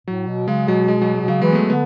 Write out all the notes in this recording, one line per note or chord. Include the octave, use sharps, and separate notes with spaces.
A2 F#3
B2
C#3 G#3
B2 F#3
G#3
F#3
G#3
B2
C#3 F#3
E3 G#3
B3
A3
D3 B3